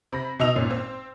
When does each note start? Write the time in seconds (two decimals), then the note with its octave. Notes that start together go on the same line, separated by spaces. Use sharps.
0.12 C3 B5 A#6
0.39 B2 D#4 D#5 E6 F7
0.56 G#1 A#2 C#4
0.71 C4